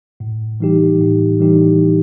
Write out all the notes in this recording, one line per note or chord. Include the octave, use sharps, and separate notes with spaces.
A2
E3 G3 D#4 G4
A2
E3 G3 D#4 G4